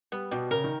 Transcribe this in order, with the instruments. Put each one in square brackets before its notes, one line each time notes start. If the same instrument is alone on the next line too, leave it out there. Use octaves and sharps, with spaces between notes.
[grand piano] G3 [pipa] B3
[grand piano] B2 [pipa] G3
[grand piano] C#3 [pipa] A#4
[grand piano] D#3